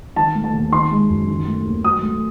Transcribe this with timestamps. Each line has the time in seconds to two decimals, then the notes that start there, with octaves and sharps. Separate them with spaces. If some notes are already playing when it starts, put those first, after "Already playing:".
0.16 D#3 A5
0.35 A3
0.44 A5
0.53 D#2
0.72 D#3 C6
0.91 G#3
1.09 F#2
1.28 D#3
1.47 A3
1.65 D#2
1.84 F#3 D#6
2.03 A3